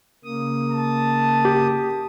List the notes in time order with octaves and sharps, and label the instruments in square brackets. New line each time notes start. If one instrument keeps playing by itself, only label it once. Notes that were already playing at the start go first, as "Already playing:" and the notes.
[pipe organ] C#3 A#3 D#6
[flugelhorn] A5
[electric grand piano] G4